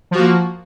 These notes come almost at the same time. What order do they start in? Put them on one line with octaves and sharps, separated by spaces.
F3 F#4 A#3